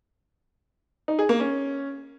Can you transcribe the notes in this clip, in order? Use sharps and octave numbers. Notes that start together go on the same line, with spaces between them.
D#4
G#4
A#3
C#4